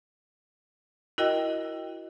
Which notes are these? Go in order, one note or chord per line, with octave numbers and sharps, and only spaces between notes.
E4 F#4 A#4 D#5 G5